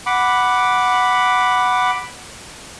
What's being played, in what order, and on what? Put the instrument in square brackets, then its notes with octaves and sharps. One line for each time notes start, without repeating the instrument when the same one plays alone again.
[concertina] F#5 B5 D6